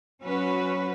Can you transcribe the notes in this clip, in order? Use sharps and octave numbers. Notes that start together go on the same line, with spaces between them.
F#3 C#4 F#4 B4